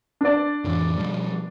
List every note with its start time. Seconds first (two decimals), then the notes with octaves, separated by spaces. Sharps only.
0.21 D4 D5
0.64 F2 A2 E3
0.98 B2 F3 G3